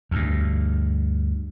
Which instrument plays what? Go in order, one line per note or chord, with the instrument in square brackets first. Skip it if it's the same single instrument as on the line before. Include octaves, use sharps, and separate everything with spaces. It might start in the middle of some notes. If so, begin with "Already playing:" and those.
[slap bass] D2 G2